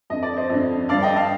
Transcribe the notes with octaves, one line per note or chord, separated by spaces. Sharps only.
F2 D3 D#5
D5
C5 D#5
F2 D3
G2 D3 D5 F5
D#5 G5
F5 A5